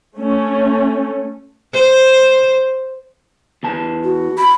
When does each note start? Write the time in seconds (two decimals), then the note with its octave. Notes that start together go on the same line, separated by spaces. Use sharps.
0.17 A3 C#4
1.73 C5
3.63 E2 E3 A5
4.04 F#4
4.38 B5